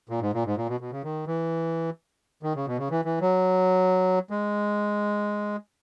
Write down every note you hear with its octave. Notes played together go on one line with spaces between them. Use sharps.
A#2
G#2
A#2
G#2
A#2
B2
B2
C#3
D#3
E3
D#3
C#3
B2
C#3
E3
E3
F#3
G#3